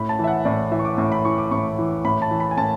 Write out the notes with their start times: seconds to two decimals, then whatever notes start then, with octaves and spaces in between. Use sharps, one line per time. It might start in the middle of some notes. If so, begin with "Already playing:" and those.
Already playing: A2 B5
0.09 A5
0.19 E3 E5
0.28 F#5
0.45 A2 D5
0.72 E3 E5
0.79 C#6
0.85 D6
0.98 A2 C#6
1.12 B5
1.25 E3 C#6
1.38 D6
1.51 A2 C#6
1.79 E3
2.05 A2 B5
2.22 A5
2.31 E3
2.40 B5
2.51 G#5
2.57 A2 A5